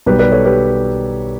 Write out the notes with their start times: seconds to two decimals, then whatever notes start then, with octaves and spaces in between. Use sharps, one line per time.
0.06 B1 B2 G3 G4 B4
0.19 B4 D5
0.32 A4 C#5
0.45 G4 B4